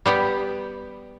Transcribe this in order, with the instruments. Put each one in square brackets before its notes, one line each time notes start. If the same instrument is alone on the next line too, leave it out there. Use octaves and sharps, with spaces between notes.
[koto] G3 B3 G4